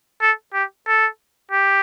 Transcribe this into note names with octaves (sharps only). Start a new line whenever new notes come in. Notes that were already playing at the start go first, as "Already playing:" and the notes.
A4
G4
A4
G4